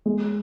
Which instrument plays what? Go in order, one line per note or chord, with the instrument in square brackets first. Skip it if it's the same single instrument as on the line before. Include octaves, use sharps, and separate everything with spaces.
[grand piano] G#3